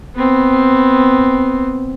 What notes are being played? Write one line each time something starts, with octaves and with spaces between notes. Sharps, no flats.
B3 C4